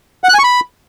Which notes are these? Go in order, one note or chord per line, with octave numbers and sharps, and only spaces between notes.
F#5
F#6
G#5
C#6
B5